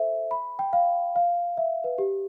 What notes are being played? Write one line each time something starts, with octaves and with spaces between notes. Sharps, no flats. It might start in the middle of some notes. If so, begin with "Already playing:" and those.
Already playing: A4 C5 E5
B5
G5
F5
F5
E5
B4
G4